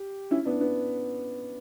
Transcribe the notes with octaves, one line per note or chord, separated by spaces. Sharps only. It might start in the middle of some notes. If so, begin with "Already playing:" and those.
Already playing: G4
C#4 E4
B3 D4
B3